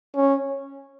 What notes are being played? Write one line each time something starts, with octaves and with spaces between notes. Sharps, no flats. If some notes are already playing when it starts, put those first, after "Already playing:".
C#4